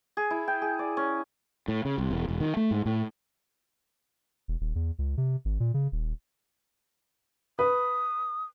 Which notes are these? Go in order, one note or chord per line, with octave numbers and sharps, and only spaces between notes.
G#4
E4
G5
G#4
D5
C#4
A2
C#3
C2
E1
E1
D#3
A3
G#2
A2
E1
D#1
E2
C#2
C3
G#1
A#2
C#3
D#1
B4 D#6